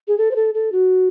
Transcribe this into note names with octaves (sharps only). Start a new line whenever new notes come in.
G#4
A4
C5
A4
A4
F#4